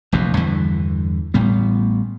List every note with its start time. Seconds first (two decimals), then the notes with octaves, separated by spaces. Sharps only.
0.12 F1 A#1 E2 B2
0.37 E2 G2 D3 E3
1.34 A1 A2 G3 B3